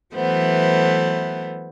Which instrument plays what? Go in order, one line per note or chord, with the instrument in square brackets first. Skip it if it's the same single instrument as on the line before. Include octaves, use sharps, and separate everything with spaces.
[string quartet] E3 F#3 A3 B3 C5